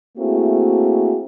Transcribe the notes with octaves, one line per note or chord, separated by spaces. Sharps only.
A3 A#3 C4 E4 F#4 G#4